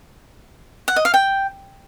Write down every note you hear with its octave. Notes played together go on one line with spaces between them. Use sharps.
F#5
D#5
F5
G5